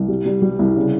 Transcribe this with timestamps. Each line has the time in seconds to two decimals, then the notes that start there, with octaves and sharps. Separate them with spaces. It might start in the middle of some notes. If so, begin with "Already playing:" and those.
Already playing: C2
0.08 G3
0.26 G3
0.42 G3
0.59 C2
0.76 C#3